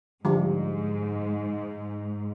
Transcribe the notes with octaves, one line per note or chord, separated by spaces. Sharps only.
G#2 D3 F3 G3